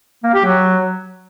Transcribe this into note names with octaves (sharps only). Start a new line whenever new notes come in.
A#3
G4
F#3